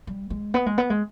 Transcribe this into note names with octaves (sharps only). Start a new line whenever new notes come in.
G3
G#3
B3
G#3
B3
G#3